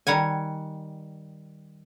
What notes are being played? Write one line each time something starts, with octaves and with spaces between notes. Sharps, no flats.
D#3 G3 F#5 G#5